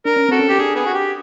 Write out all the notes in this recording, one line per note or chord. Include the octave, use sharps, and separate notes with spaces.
D4 A#4
C#4
C4 F#4 A4
C#4
G4
D4 G#4
B3 G#4
F#4
G4